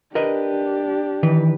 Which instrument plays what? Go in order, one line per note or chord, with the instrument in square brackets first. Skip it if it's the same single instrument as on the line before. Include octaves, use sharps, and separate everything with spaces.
[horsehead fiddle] D4 G4 [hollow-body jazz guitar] A#4 B4 D#5
[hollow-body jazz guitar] D#3 E3 B4